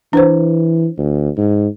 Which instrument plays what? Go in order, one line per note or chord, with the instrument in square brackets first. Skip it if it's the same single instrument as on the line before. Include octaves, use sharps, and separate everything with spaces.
[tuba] E3 [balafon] D4 B4 C5
[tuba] D2
G#2